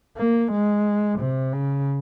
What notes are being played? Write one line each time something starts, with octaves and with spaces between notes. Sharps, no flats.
A#3
G#3
C3
C#3